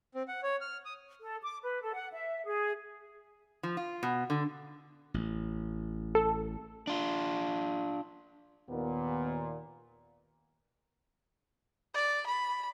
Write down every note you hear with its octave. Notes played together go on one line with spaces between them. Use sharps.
C4
F#5
C#5
F6
D#6
A4
D6
B4
A4
F#5
E5
G#4
F3
F4
B2
D3
A1
A4
D4 F4
D#2 A#2 B3
D5
B5